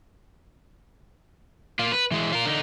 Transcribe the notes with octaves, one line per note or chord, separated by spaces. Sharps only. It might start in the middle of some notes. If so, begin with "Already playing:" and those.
A#3 F4
B4
E3 G#3
F4 A#4
D3 D#4